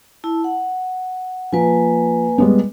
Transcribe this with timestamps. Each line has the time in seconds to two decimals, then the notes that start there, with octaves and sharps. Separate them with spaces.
0.24 E4 A5
0.44 F#5
1.53 F3 A#3 B4 G#5
2.38 G3 G#3 B3